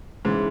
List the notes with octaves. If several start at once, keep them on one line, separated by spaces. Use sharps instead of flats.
G#2 C#3 E3